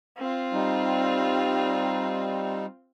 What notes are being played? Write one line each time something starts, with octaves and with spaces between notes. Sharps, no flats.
C4 F4
G3 D#4